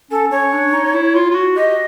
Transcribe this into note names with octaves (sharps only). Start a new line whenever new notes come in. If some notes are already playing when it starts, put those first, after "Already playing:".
C#4 A4
C#4 C#5
D4
D#4
E4
F4
F4
F#4
G4 D#5